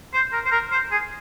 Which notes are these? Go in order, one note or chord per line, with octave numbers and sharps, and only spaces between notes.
C5
A#4
C5
A#4
C5
G#4